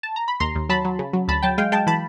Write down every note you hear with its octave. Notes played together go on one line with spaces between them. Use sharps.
A5
A#5
B5
D#2 A#5 C6
D#2
F#3 A5 B5
F#3
C#3
F#3
D2 A5 B5
F#3 G5 A5
G#3 F5 G5
G#3 G5 A5
E3 A5 B5